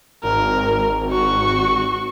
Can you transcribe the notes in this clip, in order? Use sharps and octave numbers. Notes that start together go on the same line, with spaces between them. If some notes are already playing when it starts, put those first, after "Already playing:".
G#1 A#4
F#4 C#6